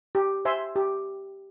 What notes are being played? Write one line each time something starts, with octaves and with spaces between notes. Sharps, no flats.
G4
C5 E5 G#5 C6
G4